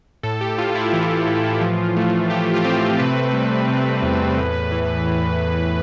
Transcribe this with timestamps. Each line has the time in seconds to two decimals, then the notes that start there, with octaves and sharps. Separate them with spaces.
0.23 A2 A4
0.41 G4
0.58 A2 F4
0.75 E4
0.93 E3 F4
1.27 A2
1.61 F3
1.97 A3
2.30 A3 G4
2.53 F4
2.64 C4 G4
2.99 C3 B4
3.34 G3
3.68 C3
4.02 E2
4.38 A2
4.72 E3
5.06 A2